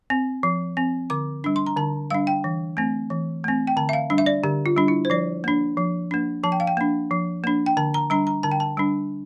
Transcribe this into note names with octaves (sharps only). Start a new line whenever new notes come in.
C4
F3
C4
D3 D6
G3 D4
C6
A#5
D3 A5
G3 D4 F5
G5
E3
A3 C4
E3
A3 C4
G5
D3 A5
E5
F5
G3 D4
E5
D5
D3 G4
F4
G3 D4
E4
C5
F3 D5
A#3 D4
F3
A#3 D4
F3 A5
G5
F5
G5
A#3 D4
F3
A#3 D4
G5
D3 A5
A#5
G3 D4 A#5
A#5
D3 A5
G5
A5
G3 D4